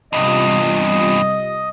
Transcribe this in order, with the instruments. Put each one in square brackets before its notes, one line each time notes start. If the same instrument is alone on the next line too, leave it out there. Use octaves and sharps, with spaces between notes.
[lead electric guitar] E2 G2 [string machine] C3 G3 F4 [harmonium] D#5